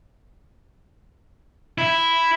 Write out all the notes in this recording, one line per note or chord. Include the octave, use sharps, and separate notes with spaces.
E4